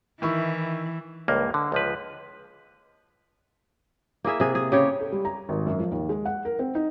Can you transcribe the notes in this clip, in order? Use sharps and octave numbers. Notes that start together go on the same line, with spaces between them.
D#3 E3 E4 C#6
C#2 G2 A#3
D3
C#2 F3 B4
A#3 E4 G#4 E5
C3 G#4
G#4
C#3 G4 C#5
A4
G3
A#5
G#1
F#2
F3
D#2
G#3
F#5
A#4
C4
D#4